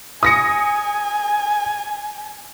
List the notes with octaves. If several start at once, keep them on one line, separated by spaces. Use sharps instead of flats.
G#5 D#6 A#6 C#7